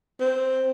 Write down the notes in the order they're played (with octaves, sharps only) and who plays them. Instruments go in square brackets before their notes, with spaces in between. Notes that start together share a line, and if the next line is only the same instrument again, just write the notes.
[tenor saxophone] C4